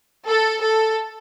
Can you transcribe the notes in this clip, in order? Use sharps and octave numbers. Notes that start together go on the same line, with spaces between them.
A4
A4